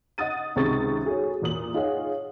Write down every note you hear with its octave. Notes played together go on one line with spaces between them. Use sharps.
D#5 F#5 D#6 A6 D#7
G#1 C#2 C3 G#3 C#6 A6
F#4 G#4 A4 C#5
E2 A#2 D#6 F#7
F4 G#4 C#5 D#5 F5 F#5